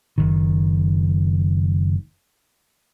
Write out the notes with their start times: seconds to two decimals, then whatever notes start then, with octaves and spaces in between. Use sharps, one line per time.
0.18 F#1 C2 D#3